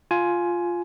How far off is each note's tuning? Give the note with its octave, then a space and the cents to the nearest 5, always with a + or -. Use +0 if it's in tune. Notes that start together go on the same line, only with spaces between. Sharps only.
F4 +0 G#5 +15